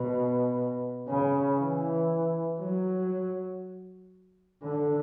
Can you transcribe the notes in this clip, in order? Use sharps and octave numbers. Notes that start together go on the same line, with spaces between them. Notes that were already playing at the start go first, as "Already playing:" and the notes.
Already playing: B2
C#3
E3
F#3
D3